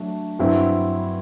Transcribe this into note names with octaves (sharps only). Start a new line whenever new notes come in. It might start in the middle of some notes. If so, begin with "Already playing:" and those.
Already playing: F#3 A3 D4
G2 F#3 C4 E4